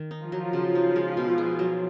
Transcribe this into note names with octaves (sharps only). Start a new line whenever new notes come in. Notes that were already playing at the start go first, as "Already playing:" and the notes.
Already playing: D#3
D#4
F3 F4
F#3
C#3
D#4
G#3
B2
G#4
F#3